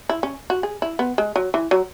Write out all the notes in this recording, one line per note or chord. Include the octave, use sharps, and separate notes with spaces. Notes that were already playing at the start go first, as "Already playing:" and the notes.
E4
C#4
F#4
G#4
E4
B3
G#3
F#3
E3
F#3